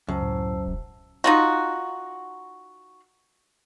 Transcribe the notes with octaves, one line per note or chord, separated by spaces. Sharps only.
C#2 F#2 C5 A5 E6
A2
E1
D#4 F4 F#4